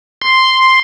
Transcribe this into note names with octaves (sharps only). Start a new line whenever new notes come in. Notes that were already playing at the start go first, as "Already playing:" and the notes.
C6